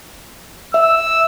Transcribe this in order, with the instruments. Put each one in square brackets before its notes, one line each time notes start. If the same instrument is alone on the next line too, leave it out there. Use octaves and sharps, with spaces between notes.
[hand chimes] E5 [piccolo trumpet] E6